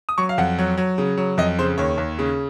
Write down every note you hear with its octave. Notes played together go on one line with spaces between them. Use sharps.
D#6
F#3 C#6
F5
F2 F#5
F#3
F#3
C#3
F#3
F2 D#5
C#3 C5
D#2 C#5
D#2
C#3